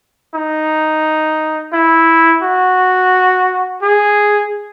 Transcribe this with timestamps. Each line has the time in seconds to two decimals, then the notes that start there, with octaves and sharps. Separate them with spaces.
0.35 D#4
1.73 E4
2.43 F#4
3.82 G#4